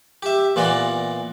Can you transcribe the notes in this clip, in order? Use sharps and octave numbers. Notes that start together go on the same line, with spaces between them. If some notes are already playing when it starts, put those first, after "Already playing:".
G4 E5
A#2 E3 B3 D5 A#5